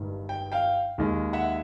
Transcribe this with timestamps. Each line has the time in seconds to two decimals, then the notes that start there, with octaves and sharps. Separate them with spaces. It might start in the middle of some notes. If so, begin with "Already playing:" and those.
Already playing: G1 G2 D#3 G#3
0.29 G5
0.52 F5 G5
0.98 D#2 D#3 G#3
1.33 E5 F#5